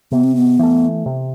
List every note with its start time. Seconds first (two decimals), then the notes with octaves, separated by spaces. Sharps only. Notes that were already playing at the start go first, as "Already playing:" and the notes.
0.11 C3 B3
0.24 C4
0.36 B3
0.59 E3 A3
1.06 C3